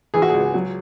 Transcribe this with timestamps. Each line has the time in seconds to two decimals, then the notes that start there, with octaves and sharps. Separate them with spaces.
0.14 E3 G#4
0.22 F#4
0.29 C#2 G#4
0.54 F#3